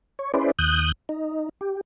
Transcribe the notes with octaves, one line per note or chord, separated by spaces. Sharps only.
C#5
C#4 E4 G#4 B4 C5 D5
D#2 D#6 F#6 G6
D#4
G4